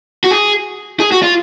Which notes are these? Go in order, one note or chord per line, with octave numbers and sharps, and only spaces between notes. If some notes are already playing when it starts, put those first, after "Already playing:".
F#4
G#4
G#4
F#4
F4